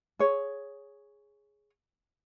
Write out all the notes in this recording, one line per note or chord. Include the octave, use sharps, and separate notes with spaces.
G#4 C#5